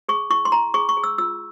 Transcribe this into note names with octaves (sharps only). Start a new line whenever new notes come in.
G#4 C#6
E4 C#6
C6
E4 A#5
G#4 C#6
C#6
G#4
E6
F4 E6